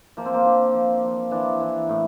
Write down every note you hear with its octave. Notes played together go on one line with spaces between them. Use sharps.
F3 A#3
C4
A#3
F3 D4
F3
F3
E3 D4
E3
A2